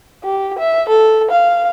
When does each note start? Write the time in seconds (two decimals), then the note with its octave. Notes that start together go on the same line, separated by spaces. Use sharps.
0.24 G4
0.59 E5
0.89 A4
1.31 F5